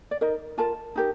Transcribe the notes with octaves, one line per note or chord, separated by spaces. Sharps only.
D5
D#4 A#4 D#5
F4 A#4 A5
D#4 G4 A#4